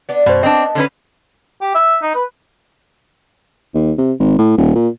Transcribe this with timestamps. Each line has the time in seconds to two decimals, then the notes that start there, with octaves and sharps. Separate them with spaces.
0.09 B3 D4
0.26 F#2 B2 B3 C5
0.43 C4 D4 D#5 A5
0.75 D3 C#4 B4
1.61 G4
1.75 E5
2.02 D#4
2.14 B4
3.74 D#2
3.98 C3
4.19 G#1
4.38 A2
4.57 D#1
4.75 A#2